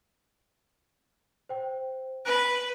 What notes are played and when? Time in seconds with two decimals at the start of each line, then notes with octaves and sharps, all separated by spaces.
1.49 C5 G5
2.25 B4 F#6 D7